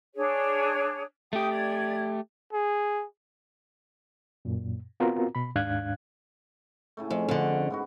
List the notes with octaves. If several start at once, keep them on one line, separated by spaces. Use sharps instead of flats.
D4 G#4 C#5
A3 G4 G5 D#6
D5 G#6
G#4
F#2 A#2
B3 C4 F4 F#4 A#4 A#5
B2 B5
D#2 G#2 D4 F5 F#6 G#6
A2 C#3 A3
F2
F2 D3 F5 F#5
G#2 B3 F#4